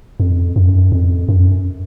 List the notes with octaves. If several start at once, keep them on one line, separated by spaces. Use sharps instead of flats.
F2
F#2
F2
F#2